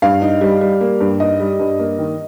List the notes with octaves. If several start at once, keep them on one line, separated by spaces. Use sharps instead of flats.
G2 F5
D#4
G3
G3
A#3
G2
D#4 D#5
G3
G2
A#3
D#3